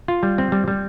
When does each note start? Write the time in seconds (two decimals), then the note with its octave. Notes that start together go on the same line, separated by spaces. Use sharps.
0.08 F4
0.23 G3
0.38 C4
0.52 G3
0.68 G3